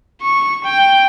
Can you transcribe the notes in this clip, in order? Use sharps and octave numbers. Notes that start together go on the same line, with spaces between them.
C#6
G5